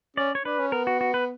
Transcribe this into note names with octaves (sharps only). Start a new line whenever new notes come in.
C#4 D5
C#5
D4 B4
C#4
B3 A#4
F#4
F#4
B4